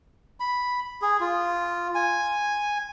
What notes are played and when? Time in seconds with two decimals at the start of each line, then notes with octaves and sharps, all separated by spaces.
0.40 B5
1.02 G#4
1.20 F4
1.95 G#5